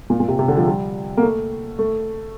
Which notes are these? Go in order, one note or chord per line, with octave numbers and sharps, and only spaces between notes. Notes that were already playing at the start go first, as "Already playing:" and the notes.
A#2
A#2
C3
C3
D3
F3
G3
A#3
A3
A3